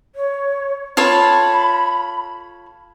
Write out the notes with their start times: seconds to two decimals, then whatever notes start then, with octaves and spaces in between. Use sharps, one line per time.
0.15 C#5
0.97 F4 A4 C#5 B5